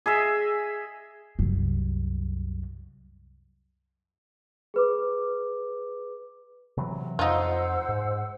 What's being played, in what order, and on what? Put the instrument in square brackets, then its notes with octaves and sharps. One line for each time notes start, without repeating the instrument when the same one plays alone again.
[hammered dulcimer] G#4 D#5 E5
[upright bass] C2 F#2
[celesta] G#4 B4 D6
[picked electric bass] C3 E3 F#3
[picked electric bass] F2 [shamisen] D#4 F4 [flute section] C5 F#5 E6
[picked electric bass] G#2